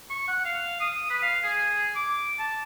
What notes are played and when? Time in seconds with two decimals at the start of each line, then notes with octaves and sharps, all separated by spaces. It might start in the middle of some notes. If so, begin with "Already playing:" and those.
0.10 C#6
0.28 F#5
0.45 F5
0.80 D#6
1.10 B4
1.23 F5
1.44 G#4
1.95 D6
2.39 A5